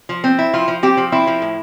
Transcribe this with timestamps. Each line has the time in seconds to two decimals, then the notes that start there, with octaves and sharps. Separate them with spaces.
0.09 F3
0.24 C4
0.39 E4
0.53 F3 F4
0.68 F3
0.83 C4 G4
0.97 F3
1.12 C4 E4
1.27 F3
1.42 A2